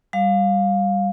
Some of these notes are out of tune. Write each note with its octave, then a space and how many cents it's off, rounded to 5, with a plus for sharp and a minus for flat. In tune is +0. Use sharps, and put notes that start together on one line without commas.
G3 +0 F5 +15